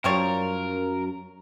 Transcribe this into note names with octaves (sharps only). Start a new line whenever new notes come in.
F#2 F3 G3 A#4 C#5